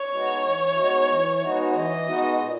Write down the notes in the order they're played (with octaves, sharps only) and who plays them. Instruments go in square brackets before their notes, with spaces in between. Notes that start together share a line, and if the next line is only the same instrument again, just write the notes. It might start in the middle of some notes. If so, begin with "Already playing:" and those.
Already playing: [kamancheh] C#5
[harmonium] G#3 B3 D#4 F#4
E3
G#3 B3 D#4 F#4
E3
G#3 B3 D#4 F#4
[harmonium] E3 [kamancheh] D#5
[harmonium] G#3 B3 D#4 F#4
A#2